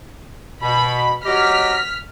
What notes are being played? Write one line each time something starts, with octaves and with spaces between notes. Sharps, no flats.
B2 B5
F#3 G4 D#5 F6 B6